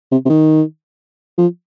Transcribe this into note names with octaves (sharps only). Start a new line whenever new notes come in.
C3
C3
D#3
F3